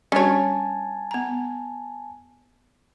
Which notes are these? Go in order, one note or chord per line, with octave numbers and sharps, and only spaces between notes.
G3 C#4 D4 F#4 C#5 G#5 A5
B3 A#5